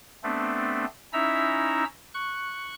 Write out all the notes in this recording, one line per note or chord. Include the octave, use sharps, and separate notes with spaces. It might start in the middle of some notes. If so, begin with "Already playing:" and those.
A3 B3 C4 D4
C#4 D#4 E4 E5 A#5 E6
C#6 F#6